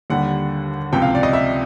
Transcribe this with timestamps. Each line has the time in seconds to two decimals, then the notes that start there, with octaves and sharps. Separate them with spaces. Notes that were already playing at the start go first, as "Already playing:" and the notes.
0.10 D#2 D3 G3 F#5
0.92 C#2 C3 F3 G5
1.02 F5
1.15 D5
1.23 D#5
1.33 E5